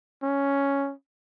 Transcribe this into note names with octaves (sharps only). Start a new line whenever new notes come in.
C#4